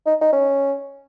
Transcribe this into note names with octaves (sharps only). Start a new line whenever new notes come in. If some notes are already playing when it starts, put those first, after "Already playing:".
D#4
D#4
C#4